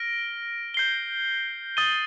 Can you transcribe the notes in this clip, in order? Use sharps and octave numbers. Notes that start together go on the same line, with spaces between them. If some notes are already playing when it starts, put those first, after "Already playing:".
Already playing: F6 A#6 D7 G7
G6 C7 G7
D#6 A6 D#7 G7